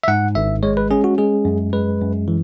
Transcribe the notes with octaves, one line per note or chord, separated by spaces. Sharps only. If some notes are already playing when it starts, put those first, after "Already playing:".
E5
G#2 F#5
G#1 E5
G#3 C#5
B4
C#4 G#4
F#4
G#3 G#4
F#2
G#3 B4
F#2
E3